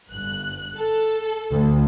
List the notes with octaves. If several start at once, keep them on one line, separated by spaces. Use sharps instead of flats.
G1 F#6
A4
D2